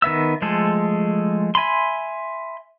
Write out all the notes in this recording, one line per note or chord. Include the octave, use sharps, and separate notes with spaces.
D#3 B3 E5 E6
F3 G#3 A3 G#4 A4
E5 G#5 B5 C6